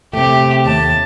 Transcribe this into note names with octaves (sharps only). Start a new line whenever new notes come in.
C3 A3 G4
D#2 A5